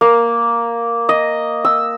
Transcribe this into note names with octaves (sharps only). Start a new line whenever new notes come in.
A#3
D#5
E6